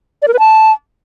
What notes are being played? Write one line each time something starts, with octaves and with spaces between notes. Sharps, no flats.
D5
A#4
B4
A5